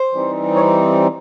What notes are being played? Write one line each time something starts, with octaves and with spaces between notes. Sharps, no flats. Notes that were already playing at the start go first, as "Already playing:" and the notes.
Already playing: C5
E3 G3 C4 D#4
C#5